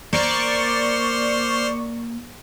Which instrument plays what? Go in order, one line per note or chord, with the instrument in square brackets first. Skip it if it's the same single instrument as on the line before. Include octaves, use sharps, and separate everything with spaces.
[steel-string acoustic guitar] A#3 [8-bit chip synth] C5 C6 F6 [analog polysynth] D5 C#6